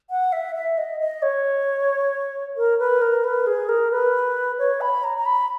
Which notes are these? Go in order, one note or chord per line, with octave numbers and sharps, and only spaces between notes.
F#5
E5
E5
D#5
D#5
C#5
A#4
B4
A#4
B4
G#4
A#4
B4
C#5
B5
A#5
A#5
B5